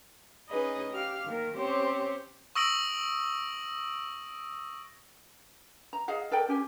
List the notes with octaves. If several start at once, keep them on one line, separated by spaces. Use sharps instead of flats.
C#4 D#4 G#4 B4 D#5
G4 F5 F6
D#3 A#3 A#4
C4 C#4 G4 C5 C#5
C#6 D#6 E6 A#6 D7 F#7
A#5
G#4 D#5 F5 F#5
A4 A#4 D5 G5
C#4 G4 G#5